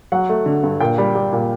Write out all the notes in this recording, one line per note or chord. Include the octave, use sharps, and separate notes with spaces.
F#3 F#5
A3
D3
G2
A#2 G5
G3
G3
A#2